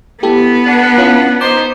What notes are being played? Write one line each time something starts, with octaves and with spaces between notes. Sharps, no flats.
B3 E4 G4 A4
D4 F#5
C#4 E4 F4
D#4 C5 D6